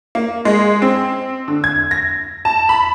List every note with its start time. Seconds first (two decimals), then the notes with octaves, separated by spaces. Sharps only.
0.15 A#3
0.45 G#3
0.82 C4
1.48 D3
1.64 G#6
1.91 A#6
2.45 A5
2.69 B5